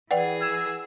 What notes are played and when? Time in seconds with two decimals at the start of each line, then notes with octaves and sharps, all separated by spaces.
0.11 E3 G#4 B4 D5 F#5 G5
0.42 E6 G#6